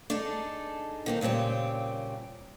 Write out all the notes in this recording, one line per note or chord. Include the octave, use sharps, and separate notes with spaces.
D4 D#4 G#4 A4
D#3 A#3 C4
A#2 C#3 G3 C4 G4